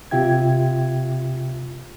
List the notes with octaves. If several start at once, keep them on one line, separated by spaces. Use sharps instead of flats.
C3 F4 G4 E5 G5 G#6